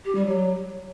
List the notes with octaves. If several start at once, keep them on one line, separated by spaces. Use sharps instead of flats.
G4
G3
F#3